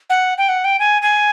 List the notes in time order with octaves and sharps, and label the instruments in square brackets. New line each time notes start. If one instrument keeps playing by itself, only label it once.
[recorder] F#5
G5
F#5
G5
G#5
G#5